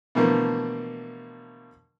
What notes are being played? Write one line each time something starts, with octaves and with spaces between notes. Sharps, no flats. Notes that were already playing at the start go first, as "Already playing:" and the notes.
B2 D3 E3 F3 A3 A#3